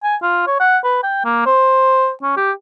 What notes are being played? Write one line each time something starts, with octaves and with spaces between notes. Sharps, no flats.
G#5
F4
C#5
F#5
B4
G5
A#3
C5
C#4
G4